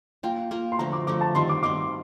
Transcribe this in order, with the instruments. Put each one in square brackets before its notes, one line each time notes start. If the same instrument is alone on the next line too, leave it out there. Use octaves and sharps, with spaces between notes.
[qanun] A#3 F4 A#4 [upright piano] G5
[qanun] A#3 F4 A#4
[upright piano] C6
[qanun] D3 F3 A3 [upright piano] A#5
[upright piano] D6
[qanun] D3 F3 A3 [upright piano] D6
[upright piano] A5
[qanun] D#3 G3 C4 [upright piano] C6
[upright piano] D6
[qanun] D#3 G3 C4 [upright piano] D6